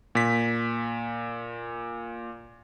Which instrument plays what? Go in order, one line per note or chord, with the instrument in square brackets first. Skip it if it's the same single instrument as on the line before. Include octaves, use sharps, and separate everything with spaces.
[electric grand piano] A#2 B6